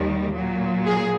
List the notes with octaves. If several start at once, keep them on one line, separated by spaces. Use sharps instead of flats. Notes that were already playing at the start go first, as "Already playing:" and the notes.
Already playing: D#2 D#3 G3
A#2 F#3
G#4